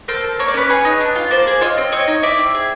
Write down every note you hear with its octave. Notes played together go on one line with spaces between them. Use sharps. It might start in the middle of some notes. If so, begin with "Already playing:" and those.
A4 A#4 C5
A4
A#3 C#5
D5
C#4 B4 C#5
G#4 B4 C#5
D#4
D4
F4
A#3 C5 D5
G#4
F4 C#5 D#5
C4
C4 C#5 D#5
D#4
E4 D5 E5
C4
G#4